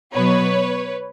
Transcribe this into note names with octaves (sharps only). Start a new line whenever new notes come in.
B2 F#3 B3 B4 C#5